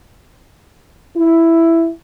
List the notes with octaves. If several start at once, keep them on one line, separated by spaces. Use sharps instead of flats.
E4